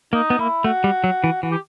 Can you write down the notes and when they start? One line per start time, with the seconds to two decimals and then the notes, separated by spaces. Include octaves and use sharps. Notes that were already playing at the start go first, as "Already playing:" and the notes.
0.13 A#3 D#4
0.30 B3
0.39 A#3 E4
0.64 A3 F#4
0.84 G3
1.04 F#3
1.24 E3
1.43 E3 F#4
1.51 G4